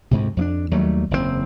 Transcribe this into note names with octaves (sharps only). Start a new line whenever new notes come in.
D2 G#2 C3
F2 A#3 D4
D#2 F#3 G3 A3
F#1 E2 A#2 C4